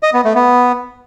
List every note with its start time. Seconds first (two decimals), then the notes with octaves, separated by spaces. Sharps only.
0.03 D#5
0.14 B3
0.25 A3
0.35 B3